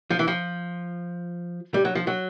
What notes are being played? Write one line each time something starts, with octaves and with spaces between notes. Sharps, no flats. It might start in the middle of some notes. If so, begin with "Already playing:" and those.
F3
E3
F3
G3
F#3
F3
F#3